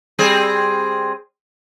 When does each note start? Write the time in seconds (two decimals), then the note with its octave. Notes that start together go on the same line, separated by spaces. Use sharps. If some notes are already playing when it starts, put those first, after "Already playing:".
0.19 G3 C4 G#4